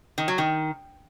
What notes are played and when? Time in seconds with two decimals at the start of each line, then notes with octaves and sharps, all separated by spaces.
0.18 D#3
0.28 F#3
0.38 D#3